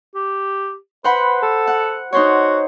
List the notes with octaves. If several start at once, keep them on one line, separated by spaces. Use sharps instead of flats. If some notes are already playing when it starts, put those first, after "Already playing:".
G4
B4 C5 F#5 B5
A4
F#5
D#4 F#4 C5 C#5